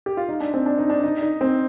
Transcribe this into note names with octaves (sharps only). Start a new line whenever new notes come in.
G4
F4
D#4
D4
C4
D4
D#4
D4
D#4
D#4
C4